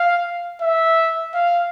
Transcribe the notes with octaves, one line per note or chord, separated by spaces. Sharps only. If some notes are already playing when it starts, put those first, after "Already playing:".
Already playing: F5
E5
F5